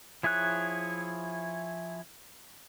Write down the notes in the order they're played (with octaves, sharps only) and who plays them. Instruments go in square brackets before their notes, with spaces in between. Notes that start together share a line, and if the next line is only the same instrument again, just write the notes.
[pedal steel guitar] F3 E4 G#4 C#5 F#6